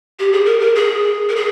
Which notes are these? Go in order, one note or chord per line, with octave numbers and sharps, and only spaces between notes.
G4
G#4
A#4
A#4
G#4
A#4
G#4